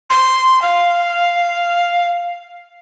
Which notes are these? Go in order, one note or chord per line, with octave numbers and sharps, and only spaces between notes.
C6
F5